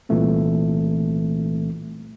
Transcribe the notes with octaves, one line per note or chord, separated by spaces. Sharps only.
C2 A#2 E3 A3 C4